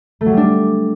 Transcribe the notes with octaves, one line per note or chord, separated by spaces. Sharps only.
A3
F#3
G3
D4